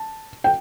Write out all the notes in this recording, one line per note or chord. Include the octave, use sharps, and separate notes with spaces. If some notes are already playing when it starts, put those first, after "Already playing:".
Already playing: A5
G5